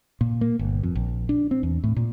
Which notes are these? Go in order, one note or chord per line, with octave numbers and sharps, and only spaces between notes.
A#2
A#3
G1
F2
A#1
D4
C4
E2
A2
A#2